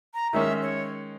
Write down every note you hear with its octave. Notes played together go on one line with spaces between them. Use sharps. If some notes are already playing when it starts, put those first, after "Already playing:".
A#5
D#3 G#3 C#4 E5
C#5